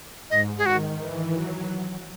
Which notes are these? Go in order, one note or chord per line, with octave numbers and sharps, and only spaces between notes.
G#2 D#5
G#4
D#3 F#4
E3
F#3